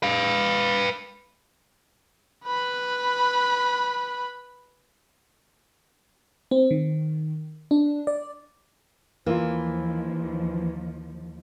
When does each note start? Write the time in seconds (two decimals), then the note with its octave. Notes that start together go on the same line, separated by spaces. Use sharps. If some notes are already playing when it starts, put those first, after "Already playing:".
0.03 B4 F5
2.46 B4 B5
6.51 C4
6.71 D#3
7.71 D4
8.07 D5
9.26 D#2 E3 F3 A#3 F4